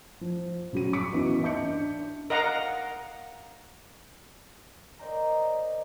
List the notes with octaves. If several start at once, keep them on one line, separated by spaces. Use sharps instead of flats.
F3
C#3 F#3 D#7
C#6 D6 B6 C#7
E3 B3 C#4 D#4 F#4
D#5 E5 A5 D6 G6 C#7
D4
A#4 D#5 F5 F#5 A#5
A#4 C5 D5 D#5 G5 A#5